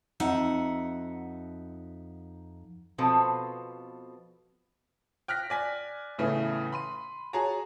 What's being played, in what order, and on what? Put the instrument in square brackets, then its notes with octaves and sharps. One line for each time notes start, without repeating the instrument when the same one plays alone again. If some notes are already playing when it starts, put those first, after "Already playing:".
[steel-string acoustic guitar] F2 D#4 E5 F#5
[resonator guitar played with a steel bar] B2 F3 B3 C4 A4 A5
[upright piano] G5 F6 F#6 A#6 B6
D5 G#5 B6
A2 C#3 E3 A3 B3
B5 C6 D#7
F#4 G#4 C#5 A5 A#5